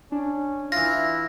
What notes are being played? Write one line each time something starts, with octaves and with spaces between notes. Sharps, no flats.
C#4 D4
E3 E4 F4 A#6